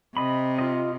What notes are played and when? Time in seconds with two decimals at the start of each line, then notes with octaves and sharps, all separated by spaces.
0.17 C3 D#5 B5
0.59 F4 D#5